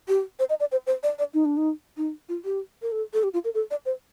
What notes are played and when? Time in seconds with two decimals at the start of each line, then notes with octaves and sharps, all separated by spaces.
0.08 G4
0.39 C5
0.50 D#5
0.60 D5
0.72 C5
0.87 C5
1.03 D5
1.19 D5
1.34 D#4
1.45 D4
1.57 D#4
1.97 D#4
2.29 F4
2.45 G4
2.82 A#4
2.92 A4
3.14 A4
3.24 G4
3.33 F4
3.45 A#4
3.55 A4
3.71 D5
3.86 C5